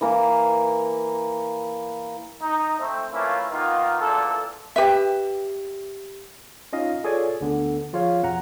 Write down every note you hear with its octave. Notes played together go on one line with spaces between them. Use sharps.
E3 A#3
D#4
A3 C4
E3 A3 A#3 C#4 E4 F4
D#3 A#3 B3 D#4 F4
E2 A#2 D4 A4
G4 B4 E5
C#4 D#4 F4 D#5 F5
F4 G#4 A4 C#5 D5 G#5
D2 D3 B3
F3 F4 G#4 C#5 F5
C2 F2 B2 F#5 A#5